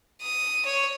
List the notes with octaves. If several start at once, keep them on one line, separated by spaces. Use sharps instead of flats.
D#6
C#5